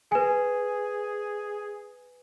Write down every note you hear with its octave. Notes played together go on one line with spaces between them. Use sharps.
G#4 B4 G#5